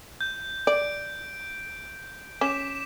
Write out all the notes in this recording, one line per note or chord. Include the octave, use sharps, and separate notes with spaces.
G6
D5 D7
C#4 D6 B6 E7